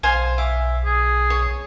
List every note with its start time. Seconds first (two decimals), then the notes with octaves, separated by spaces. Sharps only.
0.03 B1 C5 F5 G#5
0.38 E5 D6
0.85 G#4
1.30 C#5